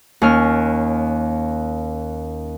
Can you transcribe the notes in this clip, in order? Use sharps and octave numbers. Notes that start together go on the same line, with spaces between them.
D#2 C#4 F6